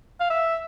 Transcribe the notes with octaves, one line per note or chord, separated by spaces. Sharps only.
F5
E5